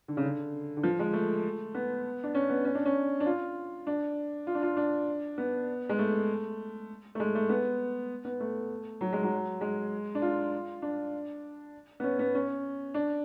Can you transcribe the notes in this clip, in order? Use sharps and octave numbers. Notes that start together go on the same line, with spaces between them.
D3
C#3
D3
D3
F3
G#3
A3
B3
D4
C#4
B3
C#4
D4
C#4
D4
F4
D4
F4
D4
F4
D4
B3
G#3
A3
A3
G#3
A3
B3
B3
A3
F#3
G#3
F#3
G#3
D4
F4
D4
B3
C#4
B3
C#4
D4